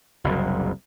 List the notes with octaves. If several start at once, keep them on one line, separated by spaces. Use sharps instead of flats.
F#1 C2 F#2